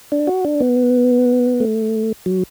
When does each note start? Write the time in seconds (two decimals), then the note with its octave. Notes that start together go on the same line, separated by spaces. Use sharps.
0.12 D4
0.27 F#4
0.45 D4
0.60 B3
1.60 A3
2.26 F#3